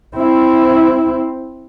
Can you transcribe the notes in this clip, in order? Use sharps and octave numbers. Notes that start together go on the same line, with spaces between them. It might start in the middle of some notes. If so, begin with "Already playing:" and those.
C4 E4